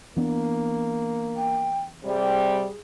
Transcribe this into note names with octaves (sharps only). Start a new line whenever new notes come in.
E3 A#3 B3 D4
G5
C3 G3 G#4